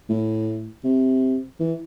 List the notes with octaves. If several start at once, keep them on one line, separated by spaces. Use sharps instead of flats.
A2
C3
E3